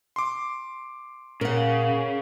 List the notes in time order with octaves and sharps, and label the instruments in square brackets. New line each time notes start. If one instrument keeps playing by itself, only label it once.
[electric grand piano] C6 D6
[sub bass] A#2 [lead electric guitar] C#3 [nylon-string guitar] A#4 F#5